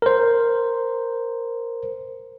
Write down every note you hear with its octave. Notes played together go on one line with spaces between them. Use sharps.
A#4 C5